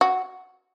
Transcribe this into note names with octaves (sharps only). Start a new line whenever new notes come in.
F#4